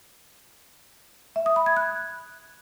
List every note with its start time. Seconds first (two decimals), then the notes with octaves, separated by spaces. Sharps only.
1.36 E5
1.46 D#6
1.56 B5
1.66 G#6
1.77 F#6